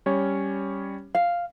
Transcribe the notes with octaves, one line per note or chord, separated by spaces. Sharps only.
G3 C#4 C#5
F5